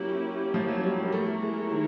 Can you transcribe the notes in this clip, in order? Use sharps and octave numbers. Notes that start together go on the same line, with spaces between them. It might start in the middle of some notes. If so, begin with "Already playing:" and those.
Already playing: F#3 A#3 C#4 E4 G4
F3
F#3
G3
G3
A3 B3 E4 G4 A#4 C#5
G#3
D#3